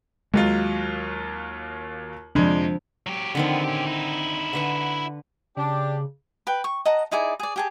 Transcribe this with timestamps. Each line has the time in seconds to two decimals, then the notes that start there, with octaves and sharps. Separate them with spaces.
0.34 D#2 F#3 G#3 F4
2.35 F2 C3 F3 G#3 D4
3.07 F#3 G4
3.35 D3 D#3 F3 B3 C4
3.64 C#4 G4
3.87 D#4 E4
4.53 D3 B4 F#5
5.57 C#3 D4 G4
6.47 B4 G5
6.64 C#6
6.85 D#5 F#5 A5 A#5
7.11 D#4 E4 G#4 D5
7.40 G#4 D5
7.56 G4 G#4 A5